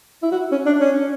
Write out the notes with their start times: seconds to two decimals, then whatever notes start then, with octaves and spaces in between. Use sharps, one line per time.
0.23 E4
0.32 F#4
0.52 C#4
0.66 D4
0.81 C#4